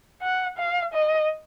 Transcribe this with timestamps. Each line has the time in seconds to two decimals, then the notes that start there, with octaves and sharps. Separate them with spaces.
0.22 F#5
0.58 F5
0.94 D#5